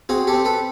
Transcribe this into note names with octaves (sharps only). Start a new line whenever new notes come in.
C4 F#4 G#4
G4 A4
C4
A4 B4